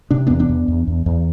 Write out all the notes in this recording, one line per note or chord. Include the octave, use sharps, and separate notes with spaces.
C3 D4
B3 D4
E2
B3 D4
E2
E2
E2
E2